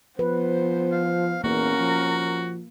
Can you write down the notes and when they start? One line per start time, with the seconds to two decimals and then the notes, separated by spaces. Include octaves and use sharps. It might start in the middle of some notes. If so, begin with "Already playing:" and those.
0.19 F3 B3 B4 C5
0.92 F5
1.44 E2 A#3 C#4 F#4 A#4
1.80 F3